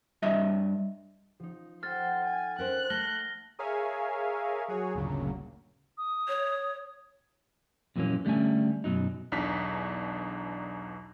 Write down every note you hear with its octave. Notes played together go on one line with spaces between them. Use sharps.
G2 D#5 E5
F3 D#4
A4 C5 F#5 G5 F6 A6
G#5
C#4 A#4 C5 F#6
A3 F6 A#6 G7
G#4 A#4 C#5 E5 F5 G#5
F#3 F#4 G#4 C#5
G1 D2 A#2 C#3 F#3
D#6
C#5
F2 A#2 E3 F#3 A#3 C#4
D3 G3 A3 C#4 G#5
F#2 B2 F#3 D#4
B1 E2 D4 D#4 B6